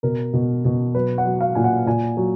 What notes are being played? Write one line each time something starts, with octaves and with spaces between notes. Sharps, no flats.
B2 A#4
B2
B2
F#3 B4
F#5
F#3
F5
A#2 G#5
F#5
A#2 G#5
F#3